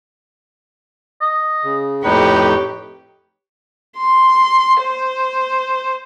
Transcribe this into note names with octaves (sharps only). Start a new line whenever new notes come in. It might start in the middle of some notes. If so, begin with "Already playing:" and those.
D#5
C#3
F2 A2 D#4 G4 B4 C#5
C6
C5